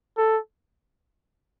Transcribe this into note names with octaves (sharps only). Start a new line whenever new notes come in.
A4